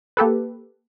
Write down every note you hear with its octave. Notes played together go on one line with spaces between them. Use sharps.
A#3 G4 A4 B4